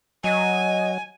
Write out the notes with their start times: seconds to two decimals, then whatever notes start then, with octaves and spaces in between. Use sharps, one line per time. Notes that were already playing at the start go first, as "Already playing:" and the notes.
0.24 F#3 D#5 G#5